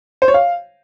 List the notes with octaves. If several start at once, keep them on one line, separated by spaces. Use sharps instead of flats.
C5
C#5
F5